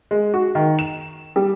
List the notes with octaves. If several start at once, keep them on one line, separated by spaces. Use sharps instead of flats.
G#3
F#4
D#3
E7
G3